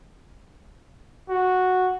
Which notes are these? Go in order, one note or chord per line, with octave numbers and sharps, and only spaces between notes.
F#4